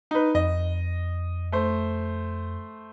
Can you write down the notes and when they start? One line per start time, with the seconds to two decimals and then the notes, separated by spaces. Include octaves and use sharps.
0.11 D#4 B4
0.35 F2 D#5
1.52 A3 C5